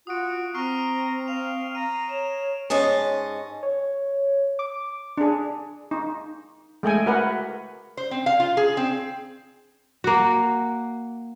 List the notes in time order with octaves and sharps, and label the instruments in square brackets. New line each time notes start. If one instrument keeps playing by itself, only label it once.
[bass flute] F4 [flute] F#4 [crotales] D#6 D7
[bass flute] C4 [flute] A#5 [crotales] C#6 F6 C7
[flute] F5 [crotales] F7
[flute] A#5 [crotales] D#7
[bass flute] C#5 [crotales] E7
[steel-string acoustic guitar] G#2 C#4 D#5 A5
[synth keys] C#5
D6
[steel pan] D4 G#4
D#4
G#3 A3 G5 G#5
F#4 A#4 B4 F#5
[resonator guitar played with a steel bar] C5
C4
F5
F4
G#4
C4
[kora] A#3 F#4